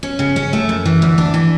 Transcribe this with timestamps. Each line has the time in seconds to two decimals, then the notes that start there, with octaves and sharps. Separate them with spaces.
0.03 C#4
0.19 C#3
0.36 C#4
0.53 A3
0.69 F#2
0.85 E3
1.02 D2
1.18 D4
1.34 E3